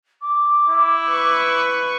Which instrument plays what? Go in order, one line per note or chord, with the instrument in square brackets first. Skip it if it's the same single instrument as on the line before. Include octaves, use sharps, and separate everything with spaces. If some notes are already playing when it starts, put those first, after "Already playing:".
[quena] D6
[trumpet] E4
[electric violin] B4 C#6